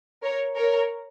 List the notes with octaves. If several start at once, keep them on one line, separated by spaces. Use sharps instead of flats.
A#4 C#5
A#4 C#5